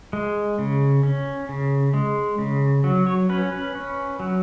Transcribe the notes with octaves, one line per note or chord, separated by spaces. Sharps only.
G#3
C#3
C#4
C#3
G#3
C#3
F#3
C#5
C#4 B4
B4
C#4
F#3